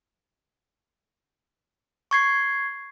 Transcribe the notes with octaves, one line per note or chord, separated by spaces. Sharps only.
C#6 G#6 C7